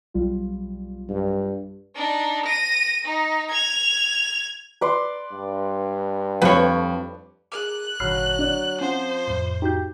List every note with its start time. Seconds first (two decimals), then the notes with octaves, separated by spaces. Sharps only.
0.14 B1 G3 F4
1.09 G2
1.96 D4 D#4
2.46 A#6 D#7
3.05 D#4
3.50 G#6 F7
4.81 B4 D5 C6
5.33 G2
6.42 F2 B4 C#5
7.52 G#4 A#4 D6 F#6
8.00 G#1 A#2 D3 F#3 B5 F6 C7
8.39 F#3 D4 D5
8.81 F3 C4 C#4 C5 F#5
9.28 F2 A2
9.62 D#4 F#4 G4 G6